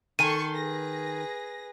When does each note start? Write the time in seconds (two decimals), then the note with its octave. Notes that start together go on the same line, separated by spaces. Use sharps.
0.19 D#3 A4 G#5 C6 C#6 D#7
0.55 G#4 B4 A#6